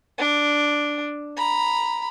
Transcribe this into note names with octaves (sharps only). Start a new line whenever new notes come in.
D4
A#5 B5